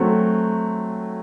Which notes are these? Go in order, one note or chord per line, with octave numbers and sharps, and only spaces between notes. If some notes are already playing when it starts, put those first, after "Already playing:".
Already playing: F#3 A3 C4